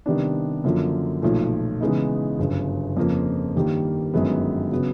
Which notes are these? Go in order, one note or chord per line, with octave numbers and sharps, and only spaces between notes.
C3 D#3 G3 B3 D4
F#2 D3 F3 A#3
B1 A#2 F3 A3
C#3 E3 G#3 B3 D#4
G1 F#2 C#3
F2 C#3 F3 A#3
G2 D#3 G3 A#3
G1 F#2 D#3 G#3 B3
C#3 F#3 B3